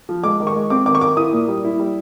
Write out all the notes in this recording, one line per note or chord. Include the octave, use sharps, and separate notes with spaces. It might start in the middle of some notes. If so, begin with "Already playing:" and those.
F3
G#3 D6
D#3
C#6
G#3
C4 D6
D#3 D6
C#6
D#3 D6
E4 D#6
A#2
G3
E4
G3